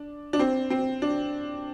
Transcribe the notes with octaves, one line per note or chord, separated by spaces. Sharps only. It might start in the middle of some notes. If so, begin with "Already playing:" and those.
Already playing: D4
D4
C4
C4
D4